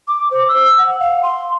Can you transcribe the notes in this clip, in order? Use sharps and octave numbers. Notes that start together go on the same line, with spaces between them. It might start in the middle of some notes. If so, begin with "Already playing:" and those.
D6
C5
E6
F#5
F5
C6